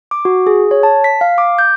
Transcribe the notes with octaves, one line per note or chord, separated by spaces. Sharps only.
D6
F#4
G#4
C#5
A5
B6
F5
D6
G6